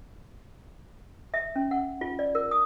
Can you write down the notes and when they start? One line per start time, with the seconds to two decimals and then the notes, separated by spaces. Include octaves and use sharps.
1.34 E5
1.56 C#4
1.71 F#5
2.01 F4
2.19 D5
2.35 A#4
2.51 D#6